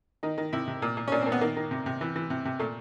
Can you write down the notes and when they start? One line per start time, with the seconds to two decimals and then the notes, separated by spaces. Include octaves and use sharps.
0.23 D#3 D#4
0.38 D#3
0.53 C3 E4
0.68 C3
0.82 A#2
0.97 A#2
1.08 C#4
1.12 A#2 D4
1.21 C4
1.26 A#2
1.32 B3
1.41 D#3 A#3
1.56 D#3
1.71 C3
1.86 C3
2.01 E3
2.16 E3
2.30 C3
2.45 C3
2.59 A#2 A3